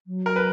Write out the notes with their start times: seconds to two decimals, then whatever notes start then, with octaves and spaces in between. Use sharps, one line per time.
0.07 F#3
0.26 A#4
0.36 B4